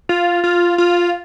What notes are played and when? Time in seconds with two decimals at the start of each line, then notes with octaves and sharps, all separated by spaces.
0.09 F4
0.44 F4
0.78 F4